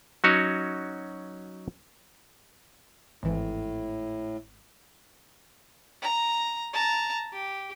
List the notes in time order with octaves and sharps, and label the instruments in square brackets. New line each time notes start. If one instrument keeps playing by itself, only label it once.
[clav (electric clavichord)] F#3 C#4 D#4 F#4 C#5
[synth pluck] G#1 E3 [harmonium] A2
[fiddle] A#5
A5 A#5
G4